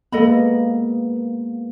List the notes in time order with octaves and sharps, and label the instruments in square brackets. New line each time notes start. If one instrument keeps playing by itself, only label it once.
[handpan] G#3 A#3 B3 [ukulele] A4 D#5 B5